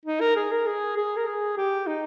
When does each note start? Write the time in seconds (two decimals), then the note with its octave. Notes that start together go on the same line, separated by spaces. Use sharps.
0.06 D#4
0.21 A#4
0.36 G#4
0.52 A#4
0.66 G#4
0.97 G#4
1.17 A#4
1.27 G#4
1.57 G4
1.87 D#4